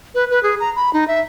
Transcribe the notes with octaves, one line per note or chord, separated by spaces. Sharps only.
B4
B4
G#4
A#5
B5
D#4
E5